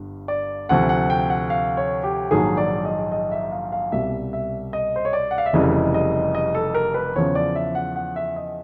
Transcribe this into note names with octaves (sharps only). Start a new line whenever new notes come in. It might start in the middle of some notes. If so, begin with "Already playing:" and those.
Already playing: G1 G2
D5
D2 C3 F3 F#5
F#5
G5
F#5
F5
C#5
G4
A#1 G#2 D#3 F#3 G#4
D5
D#5
D#5
E5
F5
F5
C2 B2 G3 E5
E5
D#5
C5
C#5
D5
F#5
F5
E5
F1 F2 C#3 E3 G3 D#5
D#5
D#5
A4
A#4
B4
E2 C#3 F3 C#5
D5
E5
F#5
F#5
E5
D#5